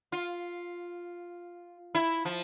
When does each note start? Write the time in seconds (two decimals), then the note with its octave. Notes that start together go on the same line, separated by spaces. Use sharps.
0.12 F4
1.95 E4
2.25 F3